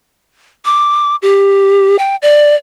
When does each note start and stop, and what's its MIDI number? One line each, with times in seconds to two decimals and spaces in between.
0.65 1.16 86
1.22 1.98 67
1.99 2.16 79
2.22 2.55 74